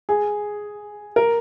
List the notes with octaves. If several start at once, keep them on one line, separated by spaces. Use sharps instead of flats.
G#4
A#4